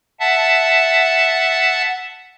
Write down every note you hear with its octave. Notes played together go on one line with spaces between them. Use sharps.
E5 F#5 A5